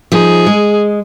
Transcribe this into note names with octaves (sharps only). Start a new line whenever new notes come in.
F3 D#4 G#4
G#3